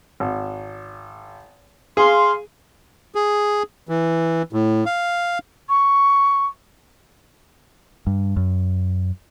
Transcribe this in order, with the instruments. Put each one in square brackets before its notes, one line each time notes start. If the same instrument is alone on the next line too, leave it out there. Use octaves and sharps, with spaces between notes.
[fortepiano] G#1
[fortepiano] G#4 [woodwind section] F5 C6
[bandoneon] G#4
E3
A2
F5
[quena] C#6
[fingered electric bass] G2
F#2